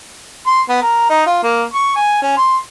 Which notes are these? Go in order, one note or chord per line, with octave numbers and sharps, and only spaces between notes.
C6
B3
A#4
D#4
F4
A#3
C#6
G#5
C#4
C6